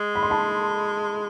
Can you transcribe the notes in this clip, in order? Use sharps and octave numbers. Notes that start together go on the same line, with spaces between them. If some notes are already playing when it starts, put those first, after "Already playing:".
Already playing: G#3
B5
C6
A5 B5